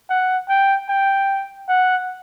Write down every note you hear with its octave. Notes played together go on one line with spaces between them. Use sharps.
F#5
G5
G5
F#5